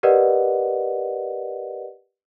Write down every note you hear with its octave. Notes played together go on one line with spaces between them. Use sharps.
G4 A#4 B4 D5 D#5 F#5